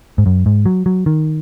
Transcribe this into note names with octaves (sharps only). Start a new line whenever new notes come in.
G#2
F#2
G#2
F#3
F#3
D#3